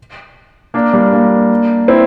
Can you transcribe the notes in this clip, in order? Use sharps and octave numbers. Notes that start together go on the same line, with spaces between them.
A#3 D4
G3 A#3
A#3 D4
C4 E4